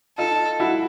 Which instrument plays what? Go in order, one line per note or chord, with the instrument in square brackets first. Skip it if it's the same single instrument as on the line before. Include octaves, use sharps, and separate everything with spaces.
[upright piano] D#4 F4 [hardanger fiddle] A4
[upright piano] E4 F#4